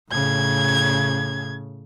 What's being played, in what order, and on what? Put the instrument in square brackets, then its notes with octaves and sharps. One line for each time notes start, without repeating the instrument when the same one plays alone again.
[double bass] A2 C#3 [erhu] G#6